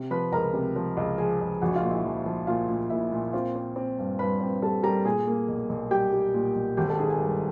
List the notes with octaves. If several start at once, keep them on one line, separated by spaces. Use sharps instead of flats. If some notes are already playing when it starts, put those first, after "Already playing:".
Already playing: C3
F3 B4 B5
C#2 A#4 A#5
C3
F3
C#2
F3 G#4 G#5
C#2
A#1 F#4 F#5
F4 F5
A#2
E4 E5
F3
F3
A#2 F4 F5
A#2
A#2 E4 E5
A#2
C4 F4 F5
C4
C4
G2
G2 B4 B5
C4
G3 A4 A5
G3 A#4 A#5
A#2 G#4 G#5
A#3
B1
B1
G3 G4 G5
G3
A#2
B1
G#1 G4 G5
A4 A5
D#3 G#4 G#5
G#4 G#5
G2